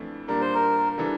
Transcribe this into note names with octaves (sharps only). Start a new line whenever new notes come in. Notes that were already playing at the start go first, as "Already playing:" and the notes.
Already playing: F2 E3 A3 D4
A#2 G3 D4 A#4
C5
A#4
E3 G3 D4 A4